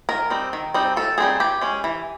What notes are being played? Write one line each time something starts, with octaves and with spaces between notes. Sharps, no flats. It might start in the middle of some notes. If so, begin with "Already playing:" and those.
D#3 A#4
G3 C4 D#4
D#3
G3 C4 D#4
D#3 A4
G3 C4 D#4 G#4
E3 G4
G#3 C#4
E3